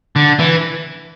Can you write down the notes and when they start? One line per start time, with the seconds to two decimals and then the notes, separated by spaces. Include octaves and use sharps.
0.16 D3
0.39 E3